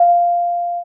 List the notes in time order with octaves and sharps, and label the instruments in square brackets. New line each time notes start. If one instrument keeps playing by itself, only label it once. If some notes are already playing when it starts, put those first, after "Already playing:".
Already playing: [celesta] F5